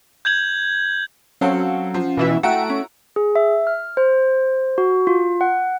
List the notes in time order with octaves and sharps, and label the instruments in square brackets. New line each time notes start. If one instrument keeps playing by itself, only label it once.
[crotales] G6 G#6 F#7
[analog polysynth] F#3 [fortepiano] C4 A4 [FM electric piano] C#4 F5 F#5
[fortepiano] F3 [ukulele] C5
[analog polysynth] B2 E3 E5
[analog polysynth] A3 D7 [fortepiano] E4 F#4 [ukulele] F#5 G5 [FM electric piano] A#5 E6
[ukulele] C#4
[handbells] G#4
E5
F6
C5
F#4
F4
F#5